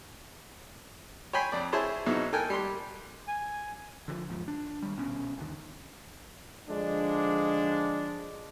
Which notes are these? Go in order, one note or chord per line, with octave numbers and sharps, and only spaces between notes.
C#5 G5 G#5 B5 C6
F2 D5
E4 G#4 C5 C#5 A5
G#2 B2 F#3 D#4 E4
A4 A#4 G5 G#5 F#6
G3 C6
G#5
D3 D#3 F3
A1 D#2 G#2 F3
D4
D#3 G3
A#1 B2 C#4
G1 D#2 D3 D#3
D3 F3 G#3 D4